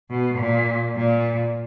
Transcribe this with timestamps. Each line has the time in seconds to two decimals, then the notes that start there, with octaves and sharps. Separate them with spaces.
0.10 B2
0.38 A#2
0.96 A#2